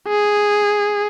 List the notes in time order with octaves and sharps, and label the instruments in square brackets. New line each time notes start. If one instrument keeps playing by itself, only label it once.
[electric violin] G#4